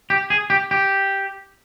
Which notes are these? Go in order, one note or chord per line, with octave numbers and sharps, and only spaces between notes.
G4
G#4
G4
G4